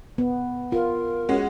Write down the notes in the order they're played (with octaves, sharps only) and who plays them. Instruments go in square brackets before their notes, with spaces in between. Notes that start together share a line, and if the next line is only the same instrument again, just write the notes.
[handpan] B3
[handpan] F4 [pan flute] A#4
[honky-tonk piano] G#3 C#4 F#4